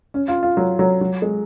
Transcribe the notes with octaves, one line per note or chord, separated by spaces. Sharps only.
C#4
F4
F4
F#3
F#3
F#3
G#3